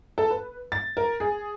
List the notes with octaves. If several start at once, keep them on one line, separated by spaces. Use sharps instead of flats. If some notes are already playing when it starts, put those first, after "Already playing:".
A4
B4
A6
A#4
G#4